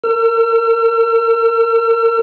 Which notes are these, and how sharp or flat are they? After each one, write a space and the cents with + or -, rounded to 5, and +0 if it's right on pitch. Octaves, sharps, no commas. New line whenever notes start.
A#4 -20 E6 +45